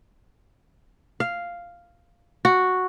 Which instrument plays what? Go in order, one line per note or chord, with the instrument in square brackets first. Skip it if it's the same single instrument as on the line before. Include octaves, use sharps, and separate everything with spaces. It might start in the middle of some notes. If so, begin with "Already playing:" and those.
[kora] F5
F#4